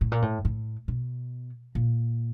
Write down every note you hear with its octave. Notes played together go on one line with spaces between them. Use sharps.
A2
A#2
A2
A2
B2
A#2